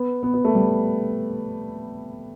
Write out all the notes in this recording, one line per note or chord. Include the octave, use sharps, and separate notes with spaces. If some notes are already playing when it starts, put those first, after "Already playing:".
Already playing: B3
B3
B3
A3
G3